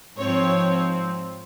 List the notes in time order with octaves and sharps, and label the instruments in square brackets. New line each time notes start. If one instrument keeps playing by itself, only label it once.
[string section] G#2 F3 C4 C#5